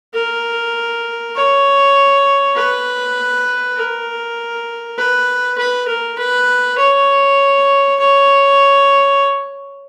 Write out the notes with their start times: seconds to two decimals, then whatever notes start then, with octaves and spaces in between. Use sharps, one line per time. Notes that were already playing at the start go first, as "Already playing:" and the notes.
0.14 A#4
1.35 C#5
2.56 B4
3.76 A#4
4.98 B4
5.58 B4
5.88 A#4
6.18 B4
6.78 C#5
8.00 C#5